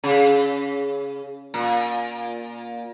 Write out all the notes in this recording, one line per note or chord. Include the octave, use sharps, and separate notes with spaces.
C#3
A#2